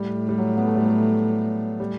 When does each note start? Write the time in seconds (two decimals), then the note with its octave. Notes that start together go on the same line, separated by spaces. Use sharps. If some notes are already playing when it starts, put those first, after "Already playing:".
Already playing: A2 G3
0.29 G3
0.38 F#3
0.57 B3
0.67 A3
0.76 G3
0.86 F#3
1.80 G3